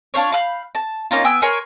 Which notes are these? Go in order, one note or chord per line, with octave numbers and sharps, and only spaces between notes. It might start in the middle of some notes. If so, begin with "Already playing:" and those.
D4 F4 C5 C#5
F5 B5 F#6 G6
A5
A#3 C#4 D#4 F4
B3 G5 G#5 E6
A#4 C#5 G#5 C6